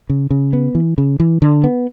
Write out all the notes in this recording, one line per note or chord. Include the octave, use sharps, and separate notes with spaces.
C#3
C#3
B3
E3
C#3
E3
D3
B3